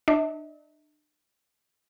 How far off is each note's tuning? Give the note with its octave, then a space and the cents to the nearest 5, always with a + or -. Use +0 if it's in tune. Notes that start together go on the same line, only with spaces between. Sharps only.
D4 +40 E5 -45